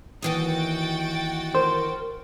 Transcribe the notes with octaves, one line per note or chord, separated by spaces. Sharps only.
D#2 E3 F#4 D#5 G5 A6
A#4 C5